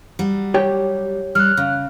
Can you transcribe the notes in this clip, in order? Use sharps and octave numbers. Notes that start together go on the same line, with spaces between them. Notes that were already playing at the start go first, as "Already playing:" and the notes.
F#3 G3
G4 C#5 G5
G3 F6 F#6
C#3